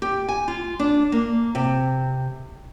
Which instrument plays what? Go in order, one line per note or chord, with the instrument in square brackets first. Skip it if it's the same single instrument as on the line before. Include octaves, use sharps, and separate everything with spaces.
[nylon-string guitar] G4
G#5
F4
D4
A#3
C3